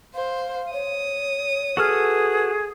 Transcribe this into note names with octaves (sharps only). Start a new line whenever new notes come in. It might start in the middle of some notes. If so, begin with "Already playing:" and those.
C5 F5
C#5 D#6
F#4 G#4 A4 B4 F6